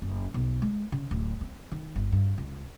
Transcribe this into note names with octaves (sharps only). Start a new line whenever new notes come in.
F#1
B1
G#3
C#3
D1
C4
D#3
G1
G2
C#2